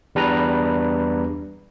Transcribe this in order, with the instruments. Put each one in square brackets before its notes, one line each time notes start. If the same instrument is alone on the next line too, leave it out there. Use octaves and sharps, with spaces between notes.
[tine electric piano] E2 G3 D4 B4 A#5